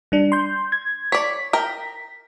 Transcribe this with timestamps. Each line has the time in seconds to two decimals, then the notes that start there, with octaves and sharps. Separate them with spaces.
0.12 G3 D4
0.32 C6 G6
0.72 G#6
1.12 C#5 D5 B6
1.53 A#4 G5